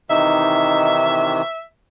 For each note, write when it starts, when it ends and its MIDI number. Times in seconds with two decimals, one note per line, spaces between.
0.10 1.42 48
0.10 1.42 51
0.10 1.42 52
0.10 1.24 63
0.10 1.63 76